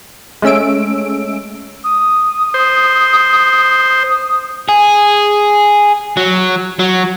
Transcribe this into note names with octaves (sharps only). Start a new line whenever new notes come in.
G#3 A3 C#4 E6 D7
D#6
C5
G#4
F#3
F#3